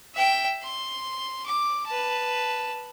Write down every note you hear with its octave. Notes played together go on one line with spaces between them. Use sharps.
E5 G5
C6
D6
B4 A5